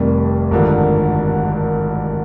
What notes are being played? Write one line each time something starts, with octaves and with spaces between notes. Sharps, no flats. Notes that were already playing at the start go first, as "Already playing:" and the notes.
Already playing: F1 F2 C3 D#3 G3
G#1 G2 D3 F3 A#3